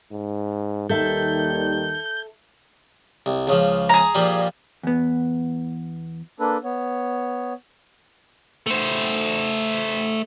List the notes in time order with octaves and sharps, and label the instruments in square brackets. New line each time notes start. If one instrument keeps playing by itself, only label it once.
[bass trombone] G#2
[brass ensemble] D#2 G3 [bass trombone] D#3 [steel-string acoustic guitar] A4 E5 [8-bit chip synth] G6
[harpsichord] C2
C#2 C#3 F3
[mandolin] G#4 A#5
[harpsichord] A#2 F3 G3
[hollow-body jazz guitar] E2 B3
[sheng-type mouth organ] A#3 D4 A4 B4
B3 C#5
[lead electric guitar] A3 C5